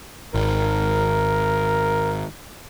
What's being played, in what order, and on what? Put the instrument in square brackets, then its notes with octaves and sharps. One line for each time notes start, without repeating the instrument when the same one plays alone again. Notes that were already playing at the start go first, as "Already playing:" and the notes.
[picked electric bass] G#1 [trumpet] A#4